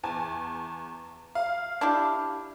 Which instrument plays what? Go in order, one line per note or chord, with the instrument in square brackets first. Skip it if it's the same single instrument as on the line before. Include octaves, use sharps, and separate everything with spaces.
[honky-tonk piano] E2 G#5 A5
F5
[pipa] D4 E4 G4